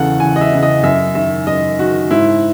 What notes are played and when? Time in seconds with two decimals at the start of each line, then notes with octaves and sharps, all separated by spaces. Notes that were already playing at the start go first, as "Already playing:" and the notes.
Already playing: E2 C#3 E3 A4 F#5
0.20 E2 G#5
0.36 D#5
0.41 E5
0.52 C#3 E3
0.63 D#5
0.83 F#2 E5
1.15 D#3 E5
1.47 F#2 D#5
1.79 D#3 F#4
2.11 G#2 E4